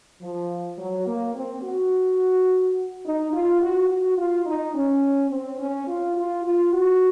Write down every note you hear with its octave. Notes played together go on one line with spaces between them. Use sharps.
F3
F#3
A#3
C4
F#4
D#4
F4
F#4
F#4
F4
D#4
C#4
C4
C#4
F4
F4
F4
F#4